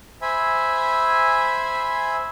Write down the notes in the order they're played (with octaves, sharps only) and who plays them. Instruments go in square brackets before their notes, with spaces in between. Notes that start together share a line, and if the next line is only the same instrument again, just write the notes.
[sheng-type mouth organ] C5 E5 G#5 B5